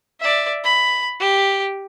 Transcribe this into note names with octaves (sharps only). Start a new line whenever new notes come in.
D5 E5
B5
G4